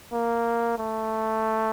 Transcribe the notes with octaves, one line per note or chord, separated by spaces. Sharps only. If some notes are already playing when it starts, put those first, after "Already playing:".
A#3
A3